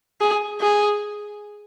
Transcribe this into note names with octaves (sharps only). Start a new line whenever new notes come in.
G#4
G#4